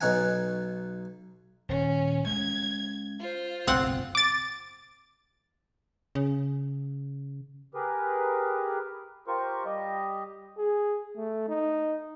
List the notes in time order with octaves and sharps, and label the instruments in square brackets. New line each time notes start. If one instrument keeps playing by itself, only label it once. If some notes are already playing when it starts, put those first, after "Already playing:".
[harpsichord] B1 B2 D#4 C#5 F#5 G#5
[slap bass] D#1 [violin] C#4
[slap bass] G#3 C#4 [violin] G#6
[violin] F4 C5
[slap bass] F#1 B1 G#2 [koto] C4 F#5
[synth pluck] D6 A6
[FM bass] C#3
[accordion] G4 G#4 A#4 B4
F4 G4 A#4 C5 C#6
G3 G4 D#5
[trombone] G#4
A3
D#4